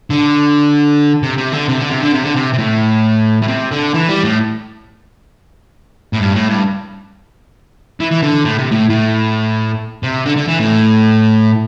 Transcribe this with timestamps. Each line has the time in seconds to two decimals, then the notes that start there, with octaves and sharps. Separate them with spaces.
0.10 D3
1.23 C3
1.38 C3
1.52 D3
1.68 C3
1.79 D3
1.90 C3
2.01 D3
2.12 C3
2.23 D3
2.34 C3
2.53 C3
2.58 A2
3.42 A2
3.48 C3
3.71 D3
3.94 E3
4.09 G3
4.24 A2
6.13 A2
6.19 G2
6.34 A2
6.49 G2
8.00 E3
8.11 E3
8.23 D3
8.45 A2
8.59 C3
8.71 A2
8.90 A2
10.03 C3
10.26 D3
10.37 D3
10.48 E3
10.60 A2